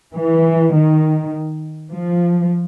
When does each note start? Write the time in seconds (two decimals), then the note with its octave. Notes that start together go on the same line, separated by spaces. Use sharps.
0.14 E3
0.73 D#3
1.91 F3